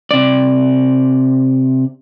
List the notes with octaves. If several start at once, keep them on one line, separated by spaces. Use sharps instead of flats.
C3 D5